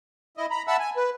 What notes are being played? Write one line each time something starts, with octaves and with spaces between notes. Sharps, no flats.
E4 D#5
A#5 B5
E5 F#5 A5 B5 E6
G#5
B4